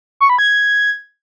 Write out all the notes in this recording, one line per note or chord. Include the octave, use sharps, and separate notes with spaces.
C#6
B5
G#6